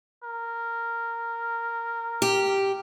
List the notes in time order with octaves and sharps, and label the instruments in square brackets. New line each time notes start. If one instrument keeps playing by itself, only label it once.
[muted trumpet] A#4
[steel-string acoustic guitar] G4